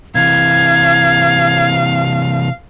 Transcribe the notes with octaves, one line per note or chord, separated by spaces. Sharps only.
C3 E3 F5 G#6